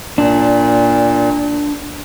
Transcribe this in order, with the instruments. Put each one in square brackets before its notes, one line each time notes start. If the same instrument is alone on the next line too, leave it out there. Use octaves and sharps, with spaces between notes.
[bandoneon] A#2 [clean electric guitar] D4